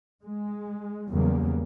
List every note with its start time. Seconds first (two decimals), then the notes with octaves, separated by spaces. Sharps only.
0.24 G#3
1.10 E2 C#3 F#3 G3 A#3